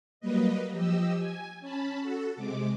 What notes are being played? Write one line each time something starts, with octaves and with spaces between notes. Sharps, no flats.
F#3 G3 A#3 B4 D#5
F3 G4 D#5 E6
G#5
C#4 A5 B5
F#4 A4
C3 G#3 D6